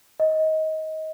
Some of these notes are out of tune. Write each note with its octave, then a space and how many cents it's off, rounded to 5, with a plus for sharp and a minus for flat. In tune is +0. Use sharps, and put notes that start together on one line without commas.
D#5 +20